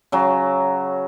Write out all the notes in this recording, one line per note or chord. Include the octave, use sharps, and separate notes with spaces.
C#3 F#3